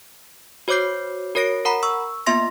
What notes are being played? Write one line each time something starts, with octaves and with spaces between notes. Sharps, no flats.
F#4 C5 C#5 D6 G6 C7
F#4 A#4 C#5 A#6 D7
A#4 F#5 A#5 B5
C#6 E6
A#3 B3 F4 E5 C6 A#6